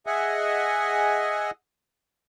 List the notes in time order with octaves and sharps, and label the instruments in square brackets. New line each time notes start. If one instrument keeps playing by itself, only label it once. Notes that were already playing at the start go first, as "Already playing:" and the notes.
[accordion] G#4 D#5 E5 F#5 G#5